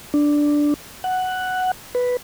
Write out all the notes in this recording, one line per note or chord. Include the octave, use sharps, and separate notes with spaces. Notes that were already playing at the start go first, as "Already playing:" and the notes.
D4
F#5
B4